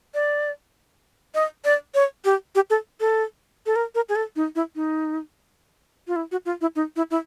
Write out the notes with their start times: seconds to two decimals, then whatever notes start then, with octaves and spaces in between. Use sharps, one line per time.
0.14 D5
1.34 D#5
1.65 D5
1.95 C#5
2.25 G4
2.55 G4
2.70 A4
3.00 A4
3.66 A4
3.76 A#4
3.95 A#4
4.09 G#4
4.16 A4
4.36 D#4
4.55 E4
4.75 D#4
6.08 F4
6.16 E4
6.31 F#4
6.45 F4
6.61 E4
6.76 D#4
6.96 E4
7.11 E4